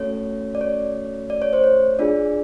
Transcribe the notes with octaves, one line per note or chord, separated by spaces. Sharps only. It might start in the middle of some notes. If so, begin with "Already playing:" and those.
Already playing: A3 C#4 F#4 A4 C#5
D5
C#5
D5
C#5
C5
C#5
D4 F4 G#4 D5